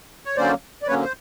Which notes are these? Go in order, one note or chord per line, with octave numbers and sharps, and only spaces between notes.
C#5
D3 F#3 A#3 C#4 C5 D5
D5
D3 F#3 A#3 C#4 B4 C#5
C5